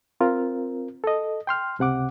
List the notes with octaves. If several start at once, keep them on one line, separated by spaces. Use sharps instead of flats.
C4 F4 A#4
A4 D#5
G5 C6 F6
C#2 C3 F#5 D6